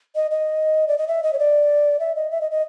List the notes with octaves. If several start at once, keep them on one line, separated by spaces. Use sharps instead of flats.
D#5
D#5
D5
D#5
E5
D#5
C#5
D5
E5
D#5
E5
D#5
D#5